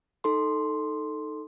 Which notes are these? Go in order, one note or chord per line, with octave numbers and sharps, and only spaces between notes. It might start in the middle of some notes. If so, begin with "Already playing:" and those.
D#4 A4 C6